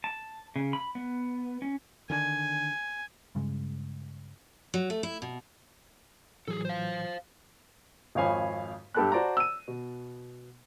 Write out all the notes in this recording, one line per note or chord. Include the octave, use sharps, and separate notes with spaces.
A5
C#3
B5
B3
C#4
D3 D#3 D4 G#5
G2 C#3 G#3
F#3
A3
E4
B2
A2 E3 F#3 G#4 A4
C5 F5
G#1 F2 C#5 F5 G#5 B5
G2 G4 A4 A5 B5 F#6
F#4 C5 D5 A5 A#5
E6 D#7
B2